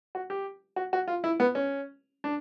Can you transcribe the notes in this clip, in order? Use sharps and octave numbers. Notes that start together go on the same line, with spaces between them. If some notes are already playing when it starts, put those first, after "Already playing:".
F#4
G4
F#4
F#4
F4
E4
B3
C#4
D4